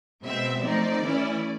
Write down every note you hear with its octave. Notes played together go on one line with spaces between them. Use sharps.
B2 G#3 C4 E5
F3 A3 C4 D#4 D5
E3 A3 C#4 E4